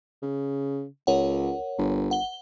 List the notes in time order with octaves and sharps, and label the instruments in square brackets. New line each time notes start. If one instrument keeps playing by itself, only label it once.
[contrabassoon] C#3
[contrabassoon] C#2 [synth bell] A#4 C#5 F#5
[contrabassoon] G1
[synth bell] F#5 G7